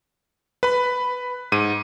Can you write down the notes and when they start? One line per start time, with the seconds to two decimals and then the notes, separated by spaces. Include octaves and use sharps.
0.63 B4 B5
1.52 G#2 D#7